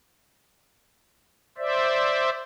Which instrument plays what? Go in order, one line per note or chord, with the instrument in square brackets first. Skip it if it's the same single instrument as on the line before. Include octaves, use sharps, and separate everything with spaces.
[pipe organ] C5 D5 E5